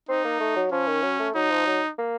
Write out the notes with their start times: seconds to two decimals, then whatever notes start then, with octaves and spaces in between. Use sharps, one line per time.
0.09 C4 D#4
0.25 A#3
0.40 A3
0.56 F#3
0.72 F3 C#4
0.88 D#3
1.03 F#3
1.19 A3
1.35 F#3 D#4
1.51 F3
1.67 F#3
1.98 A#3